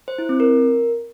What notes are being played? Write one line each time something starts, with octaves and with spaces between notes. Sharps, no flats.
C5
E4
C4
A#4